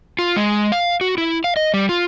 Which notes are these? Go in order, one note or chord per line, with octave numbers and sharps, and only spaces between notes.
F4
G#3
F5
F#4
E4
F5
D#5
G3
F4